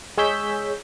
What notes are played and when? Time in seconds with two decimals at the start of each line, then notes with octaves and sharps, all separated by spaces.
0.17 G#3 G#4 C#5 E6 G6 B6